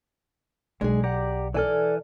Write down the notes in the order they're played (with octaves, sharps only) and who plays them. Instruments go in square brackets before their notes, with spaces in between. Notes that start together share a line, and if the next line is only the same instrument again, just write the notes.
[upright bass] B1 [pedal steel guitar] G#3 [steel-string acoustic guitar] D4 G#4
[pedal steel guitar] G4 D5 A#5 [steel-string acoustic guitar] F#5
[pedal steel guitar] E3 G#5 F6 [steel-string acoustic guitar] A4 D5